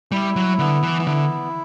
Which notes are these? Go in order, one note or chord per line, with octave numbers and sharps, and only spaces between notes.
G3 E4
F#3
D3 B3
E3
E3
D3 E4